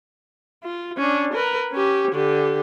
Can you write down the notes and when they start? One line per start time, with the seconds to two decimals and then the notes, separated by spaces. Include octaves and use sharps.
0.64 F4
0.97 C#4 D4
1.34 A#4 B4
1.72 C#4 G4
2.12 D3 G4